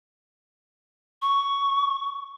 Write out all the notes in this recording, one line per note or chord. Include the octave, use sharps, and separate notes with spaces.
C#6